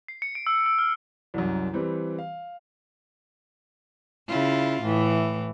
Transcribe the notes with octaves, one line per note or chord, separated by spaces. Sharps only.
C7
C#7
D7
E6
E6
F6
C2 F#2
E3 G3 C4 B4
F5
C#3 E4 F4
A2 E3